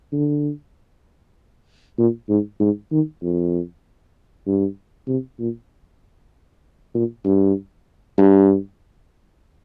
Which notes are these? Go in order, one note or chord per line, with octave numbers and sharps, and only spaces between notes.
D3
A#2
G#2
G#2
D#3
F2
G2
C3
A#2
A#2
G2
G2